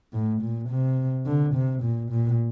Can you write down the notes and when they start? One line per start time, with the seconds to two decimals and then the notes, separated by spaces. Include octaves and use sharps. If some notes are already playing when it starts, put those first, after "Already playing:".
0.13 A2
0.42 A#2
0.70 C3
1.26 D3
1.55 C3
1.83 A#2
2.11 A#2